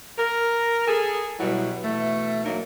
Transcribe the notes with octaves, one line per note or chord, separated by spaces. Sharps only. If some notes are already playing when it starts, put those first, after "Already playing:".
A#4
G#4 A4
B2 F#3 G3 E4
B2 E3 A3
F#3 A#3 D4 D#4